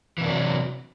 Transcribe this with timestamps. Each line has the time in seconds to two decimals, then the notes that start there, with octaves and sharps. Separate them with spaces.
0.18 E3
0.21 C3
0.24 D4
0.28 F#3